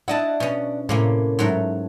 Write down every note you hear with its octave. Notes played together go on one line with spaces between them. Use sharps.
D4 E4 D5 D#5 F#5 A5
B2 C#4
A2 C3 A#3 C#4
G#2 F#3 A3